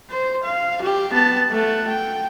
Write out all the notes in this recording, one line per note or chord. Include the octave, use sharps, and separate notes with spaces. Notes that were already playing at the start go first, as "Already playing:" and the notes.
C5
F5
G4
B3 A5
A3 F#5
G5